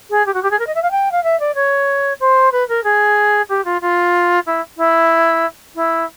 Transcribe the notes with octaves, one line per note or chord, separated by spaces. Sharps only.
G#4
G4
F#4
G4
G#4
A#4
D#5
E5
F5
G5
F5
E5
D5
C#5
C5
B4
A#4
G#4
G4
F4
F4
E4
E4
E4